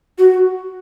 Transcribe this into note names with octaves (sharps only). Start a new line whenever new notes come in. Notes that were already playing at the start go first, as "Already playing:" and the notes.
F#4